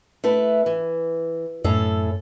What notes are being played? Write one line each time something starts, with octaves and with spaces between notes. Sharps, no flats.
A3 E4 B4
E3
F#2 A2 C#4 A4